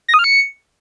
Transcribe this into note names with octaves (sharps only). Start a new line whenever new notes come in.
A#6
D#6
F6
C#7